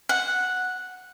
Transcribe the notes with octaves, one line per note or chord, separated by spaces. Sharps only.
F#5